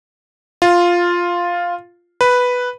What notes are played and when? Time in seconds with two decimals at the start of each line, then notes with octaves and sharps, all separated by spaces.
0.62 F4
2.21 B4